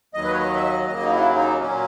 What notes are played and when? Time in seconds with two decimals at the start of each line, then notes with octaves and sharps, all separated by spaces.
0.14 D#2 D#3 F#3 D#5
0.24 B4
0.31 C#5
0.39 D#5
0.55 E5
0.63 D#5
0.87 D#2 C#3 F#3 A#3 D#5
1.02 D#4
1.11 E4
1.36 D#4
1.60 A#2 F#3 A#3 C#4